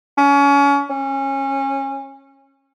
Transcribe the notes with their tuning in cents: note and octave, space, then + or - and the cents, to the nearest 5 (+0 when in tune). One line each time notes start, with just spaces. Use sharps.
C#4 +30
C#4 -25